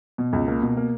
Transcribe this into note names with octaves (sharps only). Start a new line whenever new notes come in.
B2
C#2
A#3
B2
A#3